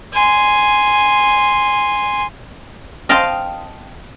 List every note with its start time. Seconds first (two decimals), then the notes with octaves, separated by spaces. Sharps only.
0.13 G#5 C6
3.09 D#5 F5 G5 A5 C6